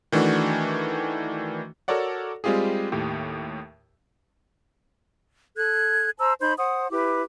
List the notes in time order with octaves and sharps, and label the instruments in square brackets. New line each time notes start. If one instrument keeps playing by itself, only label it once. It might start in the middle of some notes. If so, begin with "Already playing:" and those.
[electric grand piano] D#3 E3 A3 D4 F#4
F#4 A4 A#4 C#5 D5 F#5
G3 G#3 C4 F4 G4 G#4
D#2 A2 G4
[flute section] A4 F#6 G#6
C5 A5 A#5 E6
D#4 C5 B5 G6
C5 F#5 D#6
E4 G4 B4 D6